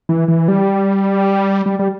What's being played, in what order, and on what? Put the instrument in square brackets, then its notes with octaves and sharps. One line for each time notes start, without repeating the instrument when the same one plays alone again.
[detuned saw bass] E3
E3
G3
G3
G3